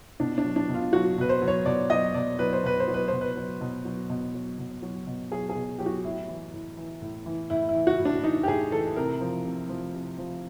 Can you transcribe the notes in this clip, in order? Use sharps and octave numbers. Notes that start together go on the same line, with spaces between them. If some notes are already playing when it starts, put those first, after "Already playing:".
B2 D4
D4
F#3
D4
B2
F4
F#3 F#4
B2 B4
C5
F#3
C#5
B2 D5
F#3 D#5
B2 D5
F#3 B4
C5
B2 B4
C5
F#3
B4
B2 C5
B4
F#3
B2
F#3
B2
F#3
B2
F#3
B2
F#3 G#4
G#4
B2
F#3 G4
F#4
A2 E4
E3
A2
E3
A2
E3
A2 E4
E4
E3
F#4
A2
D4
E3 D#4
G4
A2 G#4
E3 A4
C3 A#4
F3
C3
F3
C3
F3